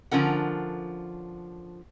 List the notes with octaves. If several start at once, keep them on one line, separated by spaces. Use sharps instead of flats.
D3 F3 C#4 A#4 F#5